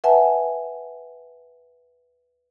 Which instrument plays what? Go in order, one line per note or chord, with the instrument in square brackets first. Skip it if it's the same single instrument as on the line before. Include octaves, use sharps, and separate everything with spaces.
[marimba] B4 E5 F#5 G#5 A5